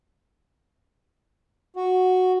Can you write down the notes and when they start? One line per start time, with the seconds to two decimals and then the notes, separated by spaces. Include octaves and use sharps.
1.76 F#4